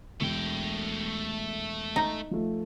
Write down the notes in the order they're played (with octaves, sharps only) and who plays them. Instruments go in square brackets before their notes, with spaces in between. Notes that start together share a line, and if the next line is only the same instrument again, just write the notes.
[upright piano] E1 [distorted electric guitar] A3 G5
[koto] D#4
[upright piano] F3 A3